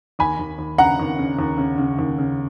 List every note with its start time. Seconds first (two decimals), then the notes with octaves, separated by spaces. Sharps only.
0.19 D#2 G#5 B5
0.39 D#2
0.59 D#2
0.78 C#3 F#5 A#5
0.99 D#2
1.18 C#3
1.39 D#2
1.58 C#3
1.78 C#3
1.99 D#2
2.18 C#3